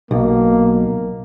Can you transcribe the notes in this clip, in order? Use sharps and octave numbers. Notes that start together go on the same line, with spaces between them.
B1 A#3